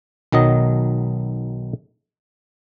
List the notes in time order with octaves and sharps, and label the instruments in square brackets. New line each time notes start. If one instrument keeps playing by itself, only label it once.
[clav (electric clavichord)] B1 D#3 F#3 D#5